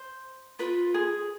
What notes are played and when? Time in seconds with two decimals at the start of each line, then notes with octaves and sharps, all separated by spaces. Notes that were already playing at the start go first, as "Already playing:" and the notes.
Already playing: C5
0.59 F4 B4
0.94 G#4